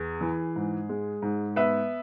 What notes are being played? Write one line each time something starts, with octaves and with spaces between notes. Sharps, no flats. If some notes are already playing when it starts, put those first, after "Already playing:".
Already playing: E2 G#4
E3
G#2
G#3
G#2
B3 B4 E5